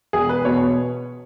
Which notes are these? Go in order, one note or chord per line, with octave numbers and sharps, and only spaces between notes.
E1 G#4
B4
B2 C#5